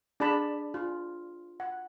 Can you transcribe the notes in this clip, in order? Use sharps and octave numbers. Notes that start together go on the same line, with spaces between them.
D4 G#4 D5 A5 B5
F4
F#5